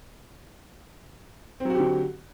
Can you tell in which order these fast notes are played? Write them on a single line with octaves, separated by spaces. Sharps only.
C4 F#3 F#4 G4 D3